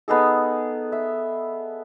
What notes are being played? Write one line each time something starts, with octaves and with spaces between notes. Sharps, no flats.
B3 D#4 G#4 A4
E5